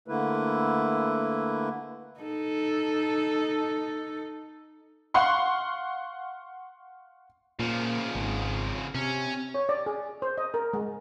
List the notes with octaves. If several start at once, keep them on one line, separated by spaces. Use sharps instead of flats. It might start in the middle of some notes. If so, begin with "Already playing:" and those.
D3 A3 A#3 E4 B4
D#4 A4
F5 F#5 C6 C#6
A#2 C#3 F3
G#1
C3 C#4
C#5
D5
G#4
C5
D#5
A#4
G#3